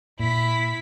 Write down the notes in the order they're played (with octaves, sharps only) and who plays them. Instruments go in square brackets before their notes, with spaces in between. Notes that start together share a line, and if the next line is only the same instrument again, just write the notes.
[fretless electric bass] A#2 [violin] E4 B6